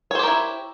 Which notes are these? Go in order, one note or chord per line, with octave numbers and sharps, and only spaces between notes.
E4 G4 A#4 C5 C#5